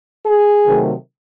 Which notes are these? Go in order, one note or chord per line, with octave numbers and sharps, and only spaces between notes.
G#4
C3 D#3 F#3 A3